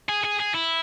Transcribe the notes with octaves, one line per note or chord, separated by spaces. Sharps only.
G#4
G#4
G#4
E4